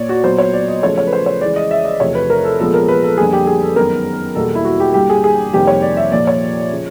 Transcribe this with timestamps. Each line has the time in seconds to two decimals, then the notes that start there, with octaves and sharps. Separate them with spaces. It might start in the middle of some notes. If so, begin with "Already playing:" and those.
Already playing: A#2 A#3 C#5 D5
0.09 F#4
0.24 A#2 F#3 B3 C5
0.38 C#5
0.54 D5
0.68 D#5
0.82 C#3 F3 A3 C#5
0.98 C#5
1.07 B4
1.13 C5
1.26 C#5
1.41 C#3 E3 G#3 D5
1.56 D#5
1.71 E5
1.85 D#5
2.00 E2 C3 F3 A3 C#5
2.15 B4
2.30 A#4
2.44 A4
2.59 A#2 F3 G#3 B3 A4
2.74 A#4
2.88 B4
3.03 A4
3.18 F2 D3 G3 A#3 G#4
3.33 G4
3.47 G#4
3.62 A4
3.76 F#2 D#3 G#3 B3 A#4
4.35 E2 B2 G3 A#3 A4
4.55 E4
4.65 F#4
4.80 G4
4.94 G2 D3 G3 A#3 G4
5.10 G#4
5.24 G#4
5.53 F2 C3 D#3 G3 A#3 G4
5.67 C#5
5.82 D5
5.97 E5
6.11 A#2 F3 A#3 D5
6.27 C#5
6.72 C#3 F3